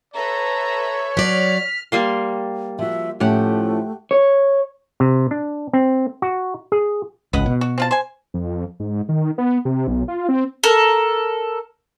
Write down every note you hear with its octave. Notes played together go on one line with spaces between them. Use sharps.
A4 B4 C#5 E5 A#5
F#3 D5 F6 B6
G3 A#3 C6
F3 F#4 E5
A2 F3 A3 C#4 G4 F#5
C#5
C3
D4
C4
F#4
G#4
G#1 C#2 B4 D#5 F#5
B2
F#4
C4 F4 A5
C5 G#5
F2
G#2
D#3
B3
C3
B1
F4
C4
A4 A#4